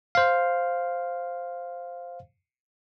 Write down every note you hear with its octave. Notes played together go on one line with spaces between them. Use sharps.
C5 F5